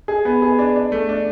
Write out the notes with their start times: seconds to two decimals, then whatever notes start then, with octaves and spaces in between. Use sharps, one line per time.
0.08 G#4
0.25 B3
0.42 G#4
0.59 D4
0.76 D4
0.92 A3
1.09 D4